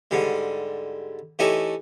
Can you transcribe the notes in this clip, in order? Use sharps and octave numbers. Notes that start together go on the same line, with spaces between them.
G#2 D3 G3
E3 A3 D#4 G4 A4 C#5